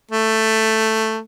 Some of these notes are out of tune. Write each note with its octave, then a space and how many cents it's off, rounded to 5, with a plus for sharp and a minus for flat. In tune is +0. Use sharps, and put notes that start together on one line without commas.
A3 +5